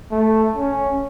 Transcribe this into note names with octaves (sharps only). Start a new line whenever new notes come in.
A3
C#4